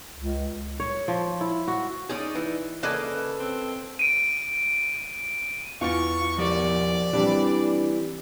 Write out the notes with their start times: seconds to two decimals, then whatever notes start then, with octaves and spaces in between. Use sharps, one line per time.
0.16 C#2
0.80 C#5
1.08 F3
1.41 E4
1.68 F#4
2.09 C#4 D#4 G#4 D5 D#6
2.35 E3
2.83 C#3 A#3 A4 B4 D5 D#5 G#5
3.40 C4
3.99 D7 D#7
5.81 E2 F4 F5 C#6 A6
6.38 F3 G4 A#4 D5
7.13 E3 G3 C4 D4 G4